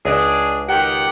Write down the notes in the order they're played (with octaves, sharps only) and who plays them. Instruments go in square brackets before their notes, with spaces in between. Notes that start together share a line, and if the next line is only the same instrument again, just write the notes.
[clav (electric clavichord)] C#2 [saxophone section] D4 G#4
[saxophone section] D#3 F#5 [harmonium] G4 G5